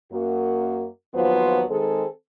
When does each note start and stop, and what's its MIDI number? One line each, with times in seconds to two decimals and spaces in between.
0.12 0.86 42
0.12 0.86 58
0.12 0.86 66
1.15 1.63 39
1.15 1.63 53
1.15 1.63 54
1.15 1.63 59
1.15 1.63 65
1.15 1.63 72
1.70 2.06 51
1.70 2.06 56
1.70 2.06 60
1.70 2.06 68
1.70 2.06 69